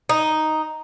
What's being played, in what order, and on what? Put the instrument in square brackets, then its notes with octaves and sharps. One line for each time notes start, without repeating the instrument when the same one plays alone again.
[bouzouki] D#4